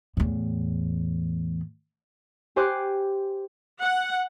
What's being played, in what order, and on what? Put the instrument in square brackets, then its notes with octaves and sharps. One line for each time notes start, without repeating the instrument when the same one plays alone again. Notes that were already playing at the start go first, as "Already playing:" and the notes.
[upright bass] E2 A2
[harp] G4 C5 G#5 C6 D6 F#6
[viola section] F#5